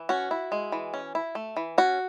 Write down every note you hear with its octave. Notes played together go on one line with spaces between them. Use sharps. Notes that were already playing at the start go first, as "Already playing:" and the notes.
Already playing: E3
C#4 F#4
E4
G#3
E3
C#4
E4
A3
E3
C#4 F#4